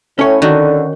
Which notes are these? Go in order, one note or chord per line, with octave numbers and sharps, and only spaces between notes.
A2 C#4 C#5
D3 D#3 F#4